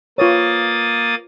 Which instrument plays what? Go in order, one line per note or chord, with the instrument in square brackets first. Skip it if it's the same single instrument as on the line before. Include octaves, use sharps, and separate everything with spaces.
[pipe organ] A#3 D#6 A6 [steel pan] F4 B4 C#5